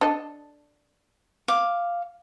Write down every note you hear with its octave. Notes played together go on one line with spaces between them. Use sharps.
D4 A4 D#5
F5 D6